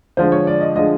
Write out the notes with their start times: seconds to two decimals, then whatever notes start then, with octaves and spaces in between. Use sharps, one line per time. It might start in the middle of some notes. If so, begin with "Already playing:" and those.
0.17 D3 F3 G#3 C5
0.32 C#5
0.47 D5
0.61 D#5
0.75 D3 F3 G#3 D#5